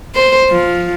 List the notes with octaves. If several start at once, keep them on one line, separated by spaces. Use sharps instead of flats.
C5
F3